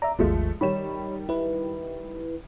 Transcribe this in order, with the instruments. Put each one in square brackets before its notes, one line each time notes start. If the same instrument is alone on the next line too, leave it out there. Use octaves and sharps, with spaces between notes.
[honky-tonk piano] D5 [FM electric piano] E5 A#5
[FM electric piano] G#1 D#2 [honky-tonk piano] F3 G#3 A3
[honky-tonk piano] D#3 G3 E7 [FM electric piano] C#5 B5
[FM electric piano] E4 B4